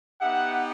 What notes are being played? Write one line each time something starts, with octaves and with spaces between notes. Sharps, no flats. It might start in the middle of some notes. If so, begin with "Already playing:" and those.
B3 D#4 G4 E5 F#5